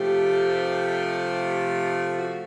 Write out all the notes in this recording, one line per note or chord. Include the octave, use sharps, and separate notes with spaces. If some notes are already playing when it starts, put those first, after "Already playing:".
Already playing: C3 F3 A3 G4
F#4